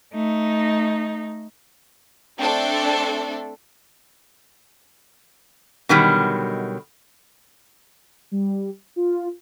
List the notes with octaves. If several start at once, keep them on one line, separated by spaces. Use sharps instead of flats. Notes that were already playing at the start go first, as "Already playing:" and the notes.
A3 D#4
A3 C4 D4 A4
B2 D3 D#3 F#3 G3
G3
F4